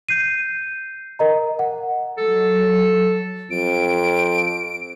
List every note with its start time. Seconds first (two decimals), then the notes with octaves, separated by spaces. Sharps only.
0.09 G6 C7 D#7
1.19 A#4 D#5 A#5
1.59 F#5
2.18 F#3 A4
3.51 F2 D7